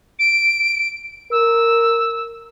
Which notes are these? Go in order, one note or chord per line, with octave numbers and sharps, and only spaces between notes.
D7
A#4 E6